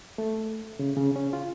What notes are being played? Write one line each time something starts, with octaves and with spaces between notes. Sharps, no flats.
A3
C#3
C#3
C#4
F4